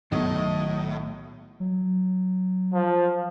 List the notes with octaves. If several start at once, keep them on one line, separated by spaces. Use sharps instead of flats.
B1 A2 D#3 F#3 D#5
F#3
F3